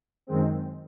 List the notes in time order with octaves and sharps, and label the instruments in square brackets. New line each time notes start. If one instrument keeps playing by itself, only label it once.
[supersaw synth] F#2 D#3 G#3 C4